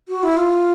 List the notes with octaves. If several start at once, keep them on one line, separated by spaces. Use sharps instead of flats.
F#4
E4
F4